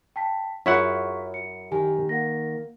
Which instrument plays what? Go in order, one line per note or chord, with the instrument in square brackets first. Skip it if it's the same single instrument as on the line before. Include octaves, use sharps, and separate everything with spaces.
[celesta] G5 A5 B6
[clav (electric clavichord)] F#2 E4 F#5 [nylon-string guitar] F4 C#5 [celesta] G#4 C#6 B6
[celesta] C#7
[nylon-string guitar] D#3 [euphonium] G4 [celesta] G#5
[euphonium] A#3 [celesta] F#5 A#6